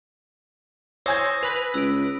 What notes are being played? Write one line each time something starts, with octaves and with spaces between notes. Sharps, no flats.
C5 C#5 G#5 D#6 E6 G#6 A#6
B4 B5 F7
C#2 E6 D7